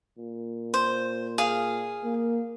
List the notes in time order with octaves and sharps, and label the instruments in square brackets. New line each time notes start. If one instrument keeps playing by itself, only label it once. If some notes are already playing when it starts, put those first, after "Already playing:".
[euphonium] A#2
[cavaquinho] C5
G#4 F5
[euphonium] A#3